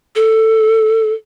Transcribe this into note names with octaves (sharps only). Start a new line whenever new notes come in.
A4